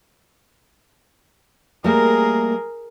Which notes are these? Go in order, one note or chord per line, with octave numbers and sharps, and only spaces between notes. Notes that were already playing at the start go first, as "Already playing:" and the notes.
G3 A3 A#3 G#4 A#4